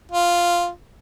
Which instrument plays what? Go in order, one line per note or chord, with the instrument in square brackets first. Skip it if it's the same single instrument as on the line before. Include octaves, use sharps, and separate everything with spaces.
[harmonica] F4